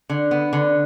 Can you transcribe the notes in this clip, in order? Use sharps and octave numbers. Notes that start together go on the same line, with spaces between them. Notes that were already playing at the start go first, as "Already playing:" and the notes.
D3
B3
D3